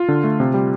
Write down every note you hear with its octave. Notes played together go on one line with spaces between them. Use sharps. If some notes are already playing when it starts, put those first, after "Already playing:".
Already playing: F4
D3
A3
C3
G3